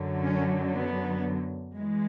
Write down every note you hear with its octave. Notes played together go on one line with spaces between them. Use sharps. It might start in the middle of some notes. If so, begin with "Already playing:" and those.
Already playing: F#2 D3 F#3
C#4
B3
E3 G#3